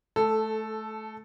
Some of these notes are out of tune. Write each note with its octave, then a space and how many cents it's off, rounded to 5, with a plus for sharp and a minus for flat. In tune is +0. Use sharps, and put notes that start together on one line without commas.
A3 -20 A4 +0